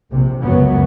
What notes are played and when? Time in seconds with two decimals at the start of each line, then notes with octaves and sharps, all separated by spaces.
0.11 A#1 C3
0.43 C#2 F#2 F#3 B3